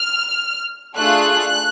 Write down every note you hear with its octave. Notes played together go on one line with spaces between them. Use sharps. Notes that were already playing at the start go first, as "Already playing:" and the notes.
Already playing: F6
A3 D4 F4 G#4 F#6